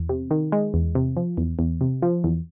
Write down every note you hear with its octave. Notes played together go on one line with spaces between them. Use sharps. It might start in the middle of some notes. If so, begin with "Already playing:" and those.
Already playing: E2
C3
D#3
G#3
E2
C3
F3
E2
E2
C3
F3
E2